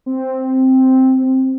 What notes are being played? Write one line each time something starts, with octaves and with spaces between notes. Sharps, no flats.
C4